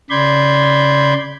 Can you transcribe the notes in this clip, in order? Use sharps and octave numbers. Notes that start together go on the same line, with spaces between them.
C#3 D5 B5 C6 G6 G#6